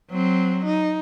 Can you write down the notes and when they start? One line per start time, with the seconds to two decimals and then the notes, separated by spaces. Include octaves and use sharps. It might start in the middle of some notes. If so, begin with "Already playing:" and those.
0.10 F#3 C4
0.65 D#4